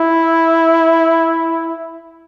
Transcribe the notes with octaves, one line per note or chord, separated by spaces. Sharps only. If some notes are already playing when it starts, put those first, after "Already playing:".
Already playing: E4